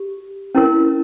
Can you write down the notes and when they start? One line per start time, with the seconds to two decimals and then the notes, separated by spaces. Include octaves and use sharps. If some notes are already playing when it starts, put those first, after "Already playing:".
Already playing: G4
0.55 C#4 E4 A#4